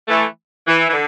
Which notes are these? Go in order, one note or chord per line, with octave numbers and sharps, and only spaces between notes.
E3 A3
E3
E3
D3